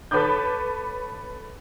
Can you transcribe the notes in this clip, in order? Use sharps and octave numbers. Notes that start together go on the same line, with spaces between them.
A4 B4 C#5 B5 D6 G6